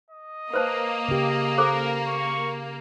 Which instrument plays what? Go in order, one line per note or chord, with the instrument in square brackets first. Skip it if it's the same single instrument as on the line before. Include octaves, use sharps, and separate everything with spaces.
[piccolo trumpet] D#5
[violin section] A#3 [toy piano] B4 C5 A5
[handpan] C#3 G4
[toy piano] A4 C5 D6 [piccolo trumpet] A#4
[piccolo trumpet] C#6